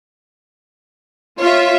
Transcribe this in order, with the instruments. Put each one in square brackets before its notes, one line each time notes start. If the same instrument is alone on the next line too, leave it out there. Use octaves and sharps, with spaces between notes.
[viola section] F4 [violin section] C#5 E5